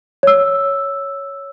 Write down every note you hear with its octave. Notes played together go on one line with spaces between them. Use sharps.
C#5 E6